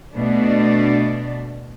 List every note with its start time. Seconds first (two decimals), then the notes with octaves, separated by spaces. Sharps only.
0.16 B2 A3 D4